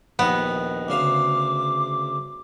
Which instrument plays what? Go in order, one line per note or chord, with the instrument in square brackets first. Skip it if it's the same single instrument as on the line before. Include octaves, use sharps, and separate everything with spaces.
[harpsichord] A#1 D#2 D#5 [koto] B3
[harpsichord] D2 C#3 F5 [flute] D6